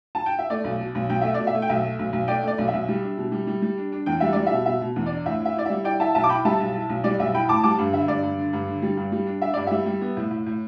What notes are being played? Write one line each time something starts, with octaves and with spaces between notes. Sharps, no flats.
A5
G5
E5
A3 D5
B1
B2
B1
B1 G5
A3 E5
B2 D5
E5
A3
G5
B1 E5
A3
B1
B1
A3 D5 G5
A3 D5
B1
E5
B1
G3
D4
B2
G3
G3
G3
D4
D4
E2 G5
G3 E5
G3 D5
B2 E5
B2 E5
B2
E2
D4 D5
A2 E5
E4 E5
E4 D5
G3 E5
E4 D5 G5
E4 E5 A5
B1 E5 A5
D6
E4 G5 B5
G3 E5 A5
B1
E4
B1
G3 D5
B1 E5
E4 G5 B5
A2 A5 D6
G3 A5 D6
G2
D3 E5
G2 D5
G2
D3
G2
D3
G3
G2
G3
D4
D4 E5
G2 D5
G3 E5
G3
B3
A2
A2
A2